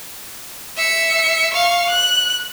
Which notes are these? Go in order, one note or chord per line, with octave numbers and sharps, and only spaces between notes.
E5 C#7
F5 C#6
F#6